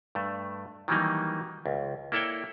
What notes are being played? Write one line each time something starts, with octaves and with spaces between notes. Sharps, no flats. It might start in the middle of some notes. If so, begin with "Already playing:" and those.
G2 A3
D#3 E3 F#3 G3 A#3 D#4
C#2
A#3 E4 A4 C#5 D5 G5